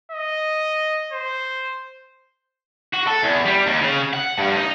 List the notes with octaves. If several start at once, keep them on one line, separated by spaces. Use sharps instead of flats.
D#5
C5
F#4
A4
E2
G3
D#2
C#3
F#5
G2
D#4